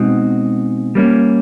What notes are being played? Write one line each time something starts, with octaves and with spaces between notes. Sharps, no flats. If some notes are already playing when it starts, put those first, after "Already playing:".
Already playing: B2 G#3 C4 D#4 F#4
G3 A#3 C#4